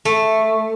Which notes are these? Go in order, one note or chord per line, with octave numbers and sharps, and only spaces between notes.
A3